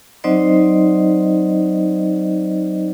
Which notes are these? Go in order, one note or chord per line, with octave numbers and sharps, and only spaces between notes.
F#3 C4 D#4 C5 D5 D#5